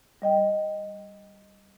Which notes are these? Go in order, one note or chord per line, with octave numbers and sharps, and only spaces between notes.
G3 D#5 G5